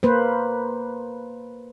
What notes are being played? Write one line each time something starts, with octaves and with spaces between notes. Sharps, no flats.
A#3 B4 C5